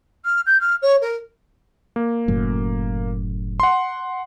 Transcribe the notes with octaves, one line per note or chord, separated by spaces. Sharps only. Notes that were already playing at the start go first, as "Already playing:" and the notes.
F6
G6
F6
C#5
A#4
A#3
F#1 F#2 A2
F#5 C6